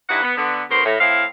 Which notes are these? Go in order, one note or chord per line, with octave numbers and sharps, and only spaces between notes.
G2 D#4 E4 B4 F#5
B3
D3 B3
D2 B3 A#4 C5 C#5
A2
A2 C4 E4 F5